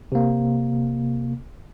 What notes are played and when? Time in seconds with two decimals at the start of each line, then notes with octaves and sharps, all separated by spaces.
0.12 C3 A#3